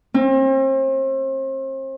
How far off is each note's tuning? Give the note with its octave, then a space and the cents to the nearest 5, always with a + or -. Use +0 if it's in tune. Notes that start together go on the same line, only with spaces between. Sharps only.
C4 +40